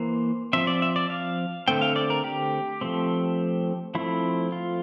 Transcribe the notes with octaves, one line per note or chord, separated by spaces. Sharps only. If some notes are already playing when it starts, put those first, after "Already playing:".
Already playing: E3 A#3 C5
F3 C4 E5
D5
E5
D5
F5
D3 A3 C4 G5
F5
D5
A#4
G4
F3 A3 C4
F3 A3 C4 E4
F4